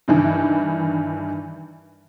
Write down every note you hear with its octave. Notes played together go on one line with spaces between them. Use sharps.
G2 D#3 E3